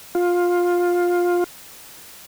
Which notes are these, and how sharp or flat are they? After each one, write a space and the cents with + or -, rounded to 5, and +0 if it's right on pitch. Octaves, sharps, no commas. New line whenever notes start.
F4 +15